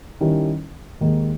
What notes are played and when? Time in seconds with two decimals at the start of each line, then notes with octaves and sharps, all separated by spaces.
0.21 D#3 G3 C#4 E4
1.01 D#2 D#3 G#3 D#4